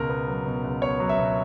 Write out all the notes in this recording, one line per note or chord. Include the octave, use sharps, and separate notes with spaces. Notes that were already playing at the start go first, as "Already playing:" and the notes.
Already playing: C#2 B2 A#4
B3
F#3
B2
C#2
B3 C#5
F#3
E5
B2